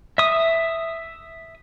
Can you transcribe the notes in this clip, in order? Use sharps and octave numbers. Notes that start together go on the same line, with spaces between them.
E5 D#6